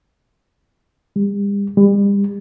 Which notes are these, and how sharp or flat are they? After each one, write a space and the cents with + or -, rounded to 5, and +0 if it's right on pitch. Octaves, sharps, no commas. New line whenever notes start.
G3 +40
G3 +35